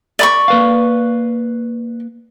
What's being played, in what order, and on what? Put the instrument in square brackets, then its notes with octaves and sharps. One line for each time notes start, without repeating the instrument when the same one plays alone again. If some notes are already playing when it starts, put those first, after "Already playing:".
[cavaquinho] D5 B5 C#6
[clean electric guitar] A#3 B4 F5